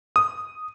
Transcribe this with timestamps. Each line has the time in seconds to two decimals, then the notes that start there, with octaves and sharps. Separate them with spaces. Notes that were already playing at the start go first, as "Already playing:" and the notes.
0.16 D#6